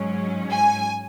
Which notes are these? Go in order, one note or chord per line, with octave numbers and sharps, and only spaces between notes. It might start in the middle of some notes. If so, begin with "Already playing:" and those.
Already playing: G#2 F#3 C#4
G#5